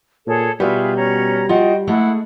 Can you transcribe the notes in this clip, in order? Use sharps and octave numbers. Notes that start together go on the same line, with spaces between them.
A#2 G#4 A4 C#5
B2 G3 F4 F#4 G#4 B4 E5
C#4 C#5 A#5
F4 F#4 D#5 F#5 G5
G#3 A3 E4 G#4 F#5